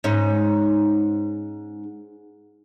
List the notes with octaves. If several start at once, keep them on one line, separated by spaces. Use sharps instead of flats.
G#2 C#4 D#4